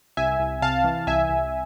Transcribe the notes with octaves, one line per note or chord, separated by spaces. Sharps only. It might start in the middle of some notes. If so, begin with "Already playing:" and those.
C2 E5 G#5
C2
C3 F5 A5
E3
C2 E5 G#5
C2